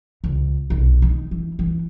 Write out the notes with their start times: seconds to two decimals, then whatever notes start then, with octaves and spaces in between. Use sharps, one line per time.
0.24 C#2
0.70 B1
1.02 D#3
1.31 E3
1.59 E3